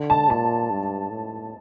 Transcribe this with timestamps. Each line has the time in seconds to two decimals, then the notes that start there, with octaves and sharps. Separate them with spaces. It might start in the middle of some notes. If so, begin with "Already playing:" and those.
Already playing: D3
0.10 A5
0.30 A#2 A5
0.71 G2
1.10 A2